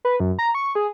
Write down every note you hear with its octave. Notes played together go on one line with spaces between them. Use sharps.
B4
F#2
A#5
C#6
G#4